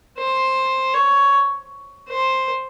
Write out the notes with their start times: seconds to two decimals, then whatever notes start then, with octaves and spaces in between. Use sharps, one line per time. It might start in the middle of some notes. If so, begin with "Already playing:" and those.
0.18 C5
0.94 C#5
2.10 C5